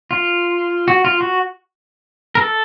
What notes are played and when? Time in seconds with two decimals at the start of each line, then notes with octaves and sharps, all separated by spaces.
0.11 F4
0.88 F#4
1.05 F4
1.21 F#4
2.35 A#4
2.39 A4